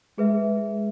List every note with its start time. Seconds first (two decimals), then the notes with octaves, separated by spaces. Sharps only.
0.18 G#3 G#4 B4 E5